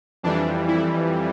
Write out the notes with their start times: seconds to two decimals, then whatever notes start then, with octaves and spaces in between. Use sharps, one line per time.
0.23 F2 E3 G3 D4
0.68 E4